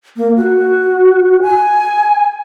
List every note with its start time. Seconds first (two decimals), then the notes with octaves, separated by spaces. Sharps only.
0.17 A#3
0.37 F#4
1.42 G#5